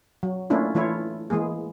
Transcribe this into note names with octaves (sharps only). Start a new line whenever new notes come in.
F#3
A3 A#3 C#4 D4 E4 F4
E3 A3 E4 F4 C#5
E3 G#3 A#3 G#4